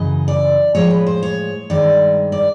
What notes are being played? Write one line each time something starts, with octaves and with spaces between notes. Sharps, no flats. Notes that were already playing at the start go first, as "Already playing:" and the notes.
Already playing: F#2 C#3 E3 D#5
D5
A2 F3 G#3 C#5
B4
C5
C#5
G2 D#3 G#3 D5
D5